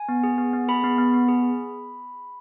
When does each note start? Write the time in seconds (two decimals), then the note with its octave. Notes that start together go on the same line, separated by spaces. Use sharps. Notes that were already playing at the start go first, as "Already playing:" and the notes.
Already playing: G#5
0.09 B3
0.24 G#4
0.38 B3
0.53 B3
0.69 G#4 B5
0.84 B3
0.98 B3
1.14 B3
1.29 G#4